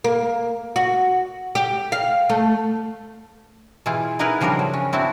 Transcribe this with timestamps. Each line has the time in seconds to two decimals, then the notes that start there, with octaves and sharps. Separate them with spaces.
0.04 A#3
0.76 F#4
1.55 G4
1.92 F5
2.30 A3
3.86 B2 E3 E4 F4 G#4
4.19 B3 D#4 E4 G#4 A#4 B4
4.41 C#3 F3 G3 D4 A#4
4.59 F#3
4.73 C#4
4.92 B3 C4 D4 E4 F#4